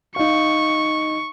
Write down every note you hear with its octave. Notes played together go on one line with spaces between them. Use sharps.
D#4 F5 C#6